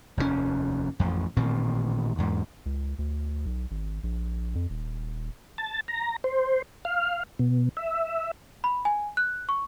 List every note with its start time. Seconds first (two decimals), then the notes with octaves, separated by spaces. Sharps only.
0.17 F1 D#2 A2 C#4
0.99 A1 F2
1.37 A1 A#2 D#3 C4
2.18 E2 G#2
2.66 C#2
2.99 D2
3.46 B1
3.71 G#1
4.03 A#1
4.55 F2
4.70 D#1
5.58 A5
5.88 A#5
6.24 C5
6.85 F5
7.39 B2
7.77 E5
8.64 B5
8.85 G#5
9.17 F#6
9.49 C#6